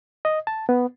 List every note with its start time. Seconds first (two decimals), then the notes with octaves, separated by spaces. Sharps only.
0.25 D#5
0.47 A5
0.69 B3